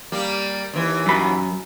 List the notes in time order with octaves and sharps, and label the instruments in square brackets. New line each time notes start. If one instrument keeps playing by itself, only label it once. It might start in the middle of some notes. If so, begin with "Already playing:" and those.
[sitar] G3 A#3
D#2 E3
[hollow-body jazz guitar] F#2 B5